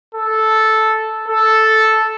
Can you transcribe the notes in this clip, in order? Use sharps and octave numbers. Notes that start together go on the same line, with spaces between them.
A4
A4